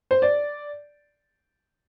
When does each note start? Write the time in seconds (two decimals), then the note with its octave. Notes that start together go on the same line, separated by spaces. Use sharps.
0.11 C5
0.22 D5